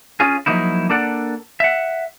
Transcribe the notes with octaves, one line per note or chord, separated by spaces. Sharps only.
C#4 F4 G#4
F3 F#3 A#3 D#4 E4
A#3 D4 A4 D5 F#5
E5 F#5